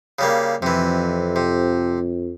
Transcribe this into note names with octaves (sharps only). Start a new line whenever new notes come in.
C#3 G3 A#3
F2 C3 E3
C3